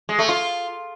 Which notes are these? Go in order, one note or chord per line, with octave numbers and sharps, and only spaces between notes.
G#3
A3
F4